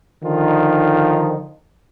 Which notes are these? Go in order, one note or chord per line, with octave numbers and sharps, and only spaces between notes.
D3 D#3 F3 D#4 F4